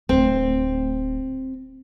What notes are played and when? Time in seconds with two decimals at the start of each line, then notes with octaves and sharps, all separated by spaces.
0.09 D1 A3 C4